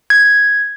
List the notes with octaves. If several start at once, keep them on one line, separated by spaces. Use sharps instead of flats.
G#6